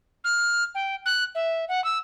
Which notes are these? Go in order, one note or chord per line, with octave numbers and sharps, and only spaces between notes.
F6
G5
F#6
E5
F#5
E6